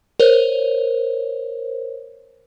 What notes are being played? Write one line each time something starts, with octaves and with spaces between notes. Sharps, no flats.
A#4 C5 C#5